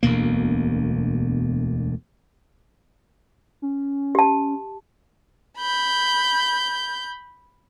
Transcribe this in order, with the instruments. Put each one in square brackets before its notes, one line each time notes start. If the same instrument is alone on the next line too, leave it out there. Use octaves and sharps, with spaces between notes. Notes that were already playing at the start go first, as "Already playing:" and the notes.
[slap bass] E1 D2 B2 A#3
[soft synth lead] C#4
[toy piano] G4 A5
[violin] B5 G6